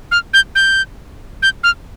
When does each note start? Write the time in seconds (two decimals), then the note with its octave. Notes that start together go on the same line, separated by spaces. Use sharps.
0.11 F6
0.34 G6
0.55 G6
1.43 G6
1.64 F6